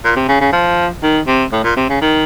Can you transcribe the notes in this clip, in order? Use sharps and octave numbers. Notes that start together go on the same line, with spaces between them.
A#2
C3
C#3
C#3
F3
D#3
C3
A2
A#2
C3
C#3
D#3